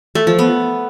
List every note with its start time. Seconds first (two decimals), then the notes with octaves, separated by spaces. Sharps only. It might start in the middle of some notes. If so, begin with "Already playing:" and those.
0.15 A3
0.27 F3
0.39 B3